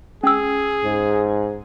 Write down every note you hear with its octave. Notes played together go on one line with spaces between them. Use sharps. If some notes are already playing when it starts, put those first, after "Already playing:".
C#4 G#4 E6
G#2